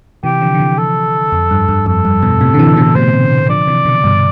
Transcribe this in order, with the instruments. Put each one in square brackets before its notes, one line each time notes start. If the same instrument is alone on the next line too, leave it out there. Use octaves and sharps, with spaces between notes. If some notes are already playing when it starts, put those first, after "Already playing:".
[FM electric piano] C3 E3 [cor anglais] G4
[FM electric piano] D3 F3
D3
C3 E3
[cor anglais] A4
[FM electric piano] F2
G2
G2
[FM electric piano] F2 [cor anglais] A4
[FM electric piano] G2
G2 B2
A2 C3
D3
C3 E3
B2 D3
[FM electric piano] A2 C3 [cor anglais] C5
[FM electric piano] D3 F3 [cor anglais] D5
[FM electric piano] C3 E3
B2 D3
G2 B2